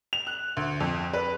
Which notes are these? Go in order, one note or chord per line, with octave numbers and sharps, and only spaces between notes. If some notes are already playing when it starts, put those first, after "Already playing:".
F7
F#6
D2
F2
B4